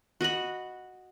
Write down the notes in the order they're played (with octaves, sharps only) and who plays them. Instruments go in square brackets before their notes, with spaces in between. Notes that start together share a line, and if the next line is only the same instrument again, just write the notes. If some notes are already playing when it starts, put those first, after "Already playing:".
[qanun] F#4 D#5 F#5 B5